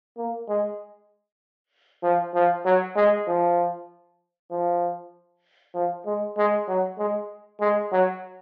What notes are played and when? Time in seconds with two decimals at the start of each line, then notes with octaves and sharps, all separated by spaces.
0.17 A#3
0.48 G#3
2.03 F3
2.34 F3
2.65 F#3
2.96 G#3
3.28 F3
4.51 F3
5.75 F3
6.06 G#3
6.37 G#3
6.68 F#3
6.98 G#3
7.60 G#3
7.92 F#3